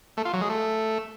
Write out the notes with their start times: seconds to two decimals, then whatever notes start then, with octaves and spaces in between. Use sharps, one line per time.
0.17 A3
0.25 F4
0.33 F#3
0.41 G#3
0.49 A3